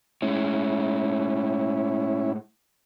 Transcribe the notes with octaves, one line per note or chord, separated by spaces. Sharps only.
A2 G#3 C#4 E4